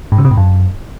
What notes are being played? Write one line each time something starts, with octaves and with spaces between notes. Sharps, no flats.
G#2
C#3
C3
G#2
F#2